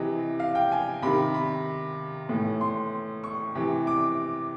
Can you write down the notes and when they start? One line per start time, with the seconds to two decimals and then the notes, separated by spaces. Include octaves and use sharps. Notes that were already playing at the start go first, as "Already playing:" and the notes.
Already playing: C3 E3 D#5
0.40 F5
0.55 G5
0.72 G#5
1.02 C3 D#3 B5
1.34 B5
2.29 A2 E3
2.61 C6
3.24 C#6
3.55 C3 E3
3.87 D6